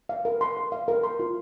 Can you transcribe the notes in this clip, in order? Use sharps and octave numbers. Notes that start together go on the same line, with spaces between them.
F5
A#4
C6
A#4
F5
A#4
C6
F4